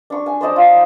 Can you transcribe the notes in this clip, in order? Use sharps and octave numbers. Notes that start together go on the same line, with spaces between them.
D4 C#6
G#5
C5 D5 D#5 A5
F4
D#4